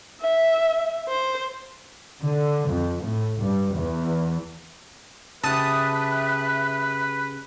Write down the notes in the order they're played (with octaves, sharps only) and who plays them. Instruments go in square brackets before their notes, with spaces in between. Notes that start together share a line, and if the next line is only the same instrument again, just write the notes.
[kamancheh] E5
C5
[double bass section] D3
F2
A2
G2
E2
[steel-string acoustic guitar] C#3 G4 [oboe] B4 [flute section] E5 F#6 [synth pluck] A5 D#6